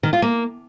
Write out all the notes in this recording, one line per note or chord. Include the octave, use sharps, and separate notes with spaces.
D#3
F4
A#3